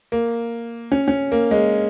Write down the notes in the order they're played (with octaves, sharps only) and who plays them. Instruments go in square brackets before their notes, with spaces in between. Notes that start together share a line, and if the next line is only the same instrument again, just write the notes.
[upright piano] A#3
C#4
C#4
A#3
G#3